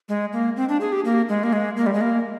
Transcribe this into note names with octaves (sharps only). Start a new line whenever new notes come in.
G#3
A#3
C4
D4
G#4
G4
A#3
G#3
A#3
G#3
A#3
G3
G#3
A#3